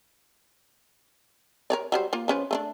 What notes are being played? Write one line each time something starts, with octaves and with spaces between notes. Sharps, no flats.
A#4 C#5 D5
F#3 G3 C5
A#3 F4
F3 C#4 B4
A3 C#4 D4